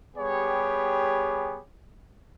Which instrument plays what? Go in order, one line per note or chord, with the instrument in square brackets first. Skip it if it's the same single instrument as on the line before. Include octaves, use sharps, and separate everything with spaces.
[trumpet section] G3 B3 G4 G#4 C#5